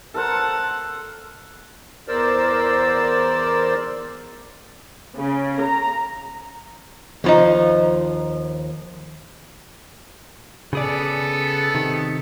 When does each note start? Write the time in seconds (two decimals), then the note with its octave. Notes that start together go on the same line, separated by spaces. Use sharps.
0.14 A4 A#4 C5 F#5 A5
2.08 E2 A#4 C5 D5 E6
5.16 C#3
5.60 A#5
7.24 D#2 F3 D#4
10.73 C#3 B3 G#4 A4 D5
11.75 C3 D#3